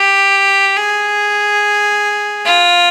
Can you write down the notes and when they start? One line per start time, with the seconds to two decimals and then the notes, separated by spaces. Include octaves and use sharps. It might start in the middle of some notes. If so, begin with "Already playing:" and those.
Already playing: G4
0.77 G#4
2.45 F4